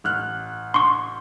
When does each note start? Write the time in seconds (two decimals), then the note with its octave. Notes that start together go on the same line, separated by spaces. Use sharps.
0.04 A1 F6 F#6
0.74 C6 C#6